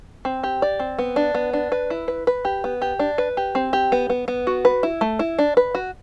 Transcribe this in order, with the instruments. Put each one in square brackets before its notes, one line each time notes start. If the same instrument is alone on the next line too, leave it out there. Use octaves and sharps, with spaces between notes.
[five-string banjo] C4
G4
D5
C4
B3
D4
B3
D4
B4
E4
B4
B4
G4
B3
G4
D4
B4
G4
C4
G4
B3
B3
B3
F#4
B4
E4
A3
E4
D4
B4
F#4